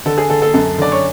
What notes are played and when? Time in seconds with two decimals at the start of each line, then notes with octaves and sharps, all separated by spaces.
0.05 D3 A4
0.18 G#4
0.30 D3 A4
0.42 A4
0.54 F#2 A4
0.78 D3 D5
0.92 C#5